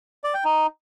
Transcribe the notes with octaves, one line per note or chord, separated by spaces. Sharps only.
D5
G5
D#4